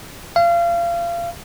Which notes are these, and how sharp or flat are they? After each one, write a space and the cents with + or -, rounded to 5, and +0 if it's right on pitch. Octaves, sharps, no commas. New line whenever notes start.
F5 -30